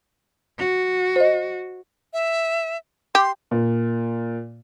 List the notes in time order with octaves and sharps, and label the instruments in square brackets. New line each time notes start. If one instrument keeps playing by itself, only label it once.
[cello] F#4
[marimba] C5 D#5
[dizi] E5
[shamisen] G4 [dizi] C6
[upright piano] A#2